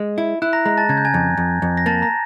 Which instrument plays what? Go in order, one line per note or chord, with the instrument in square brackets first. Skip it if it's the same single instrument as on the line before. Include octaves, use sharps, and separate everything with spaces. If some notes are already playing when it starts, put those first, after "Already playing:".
Already playing: [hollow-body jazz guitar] G#3
E4
[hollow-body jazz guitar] E4 [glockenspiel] F#6
[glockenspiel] A#5 A#6
[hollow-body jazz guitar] G#3 [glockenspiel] A#5 A#6
[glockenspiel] A5 A6
[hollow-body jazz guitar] C#3 [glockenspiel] G#6
[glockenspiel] G6
G#5 G#6
[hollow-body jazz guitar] F2
F2
F2
[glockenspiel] A#6
[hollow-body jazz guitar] A#3 [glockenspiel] A5 A6
[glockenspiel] A#5 A#6